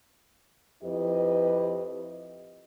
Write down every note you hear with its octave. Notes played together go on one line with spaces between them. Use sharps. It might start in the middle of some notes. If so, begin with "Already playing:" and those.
F2 E4 G4 B4 D#5